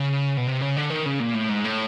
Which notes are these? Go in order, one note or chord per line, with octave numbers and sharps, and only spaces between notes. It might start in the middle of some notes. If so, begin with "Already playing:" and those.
Already playing: C#3
B2
C3
C#3
D3
D#3
C#3
A#2
A2
G#2
A2